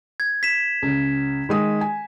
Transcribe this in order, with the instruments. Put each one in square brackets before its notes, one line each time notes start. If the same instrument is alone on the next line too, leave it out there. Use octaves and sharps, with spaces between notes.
[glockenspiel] G#6
B6 E7
[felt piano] C#2 C#3
D#3 G#3 D#6
G#5